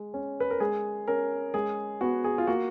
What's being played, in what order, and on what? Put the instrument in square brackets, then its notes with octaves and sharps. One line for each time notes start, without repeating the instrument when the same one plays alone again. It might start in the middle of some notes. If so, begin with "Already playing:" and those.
Already playing: [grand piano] G#3
C#4
B4
A#4
G#3 G#4
C#4 A#4
G#3 G#4
B3 F#4
G#4
F4
A#3 F#4